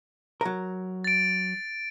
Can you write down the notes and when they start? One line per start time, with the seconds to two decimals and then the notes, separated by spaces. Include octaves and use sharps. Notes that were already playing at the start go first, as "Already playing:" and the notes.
0.41 F#3 A#4
1.04 A6 D7